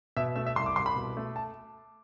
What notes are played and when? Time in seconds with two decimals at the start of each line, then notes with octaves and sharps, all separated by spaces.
0.17 B2 E5
0.36 A3 E5
0.46 E5
0.56 C2 C6
0.66 D6
0.76 C2 C6
0.86 B5
0.96 B2
1.17 A3
1.36 A5